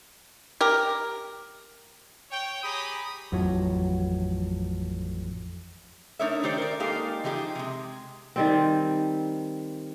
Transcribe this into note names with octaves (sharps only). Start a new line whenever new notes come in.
G4 A#4
C#5 G5
G4 G#4 A#5 B5 D#6
A1 F2 A2 F#3
A3 D4 D#4 A#4 C#5 E5
D#3 A3 G4 C5 D5
A#4 D5
G#3 A#3 D#4 G4 A4 F5
E3 F3 D#4 G4 G#4
C3 G#3
D#3 G3 C4